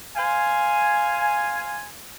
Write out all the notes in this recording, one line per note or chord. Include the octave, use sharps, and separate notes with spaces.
C5 F5 G#5